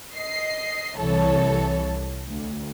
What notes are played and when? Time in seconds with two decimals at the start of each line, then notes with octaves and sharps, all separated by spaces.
0.14 D#5 C7
0.98 C2 E3 A4 C#5
2.28 D2